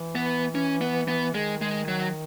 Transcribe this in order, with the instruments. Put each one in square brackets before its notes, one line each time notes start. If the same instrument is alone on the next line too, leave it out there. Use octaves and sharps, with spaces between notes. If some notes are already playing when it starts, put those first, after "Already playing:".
Already playing: [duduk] E3
[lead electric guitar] B3
C#4
B3
B3
[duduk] D#3 [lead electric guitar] G#3
[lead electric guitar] G#3
F#3